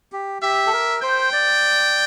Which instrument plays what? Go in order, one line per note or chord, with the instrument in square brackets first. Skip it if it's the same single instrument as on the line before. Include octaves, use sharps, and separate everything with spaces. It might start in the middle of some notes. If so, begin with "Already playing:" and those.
[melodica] G4
[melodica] G4 [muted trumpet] E5
[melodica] A4
A#4
[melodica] C5 [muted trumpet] G5
[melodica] D5